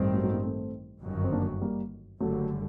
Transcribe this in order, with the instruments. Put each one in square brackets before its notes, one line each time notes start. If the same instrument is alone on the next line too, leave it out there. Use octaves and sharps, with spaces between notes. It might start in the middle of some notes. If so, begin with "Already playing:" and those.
Already playing: [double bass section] A1 G2 D#3 G3 C4
[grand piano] F#3 A3
F#3 A3
G3 A#3
A3 C4
[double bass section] G1 F#2 D#3 F#3
[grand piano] C4
A#3 D4
G3 A#3
[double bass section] F#1 F#2 D3 G3 [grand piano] F#3 A3